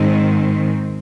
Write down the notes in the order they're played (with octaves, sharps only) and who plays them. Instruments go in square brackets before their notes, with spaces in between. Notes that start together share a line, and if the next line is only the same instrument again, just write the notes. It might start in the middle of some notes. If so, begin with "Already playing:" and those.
Already playing: [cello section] G#2 D#3 G#3 C4